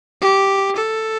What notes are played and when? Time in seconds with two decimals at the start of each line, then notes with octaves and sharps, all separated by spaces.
0.22 G4
0.76 A4